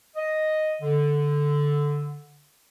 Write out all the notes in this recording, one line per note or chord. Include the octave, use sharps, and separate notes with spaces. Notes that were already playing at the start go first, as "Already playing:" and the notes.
D#5
D3